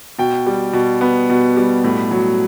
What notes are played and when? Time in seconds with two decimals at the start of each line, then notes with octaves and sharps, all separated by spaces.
0.18 B2 G5
0.46 G3
0.73 B2
1.01 B3
1.30 B2
1.56 G3
1.84 A2
2.11 F#3